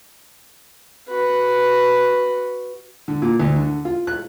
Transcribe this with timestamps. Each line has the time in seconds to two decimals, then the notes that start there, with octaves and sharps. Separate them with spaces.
1.08 F#4 B4
3.08 D3
3.22 A#2
3.40 D2
3.56 D3
3.85 F4
4.07 F#6